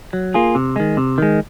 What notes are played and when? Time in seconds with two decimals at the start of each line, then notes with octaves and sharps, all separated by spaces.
0.13 F#3
0.34 A#3 F4 G#4
0.55 C3
0.76 D#3 G#3
0.97 C3
1.18 D#3 G#3